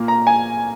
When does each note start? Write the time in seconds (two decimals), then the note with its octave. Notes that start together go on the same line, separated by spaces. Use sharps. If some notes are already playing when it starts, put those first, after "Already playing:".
Already playing: A#2 A#3
0.08 A#5
0.27 G#5